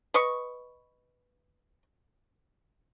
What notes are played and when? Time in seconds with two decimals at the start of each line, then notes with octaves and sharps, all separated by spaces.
0.14 B4 D#5 C#6